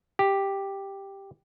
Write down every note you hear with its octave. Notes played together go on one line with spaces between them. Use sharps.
G4